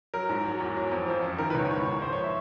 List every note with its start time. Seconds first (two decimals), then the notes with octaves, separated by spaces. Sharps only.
0.14 F#3 A#4
0.29 G#2
0.45 F#3
0.60 E2
0.77 F#3
0.92 F2
1.08 F3
1.23 F#2
1.39 D#3 A#4
1.50 B4
1.55 C#2 C#5
1.71 G#2 C#5
1.87 G#2
2.02 F3 C5
2.13 C#5
2.24 E5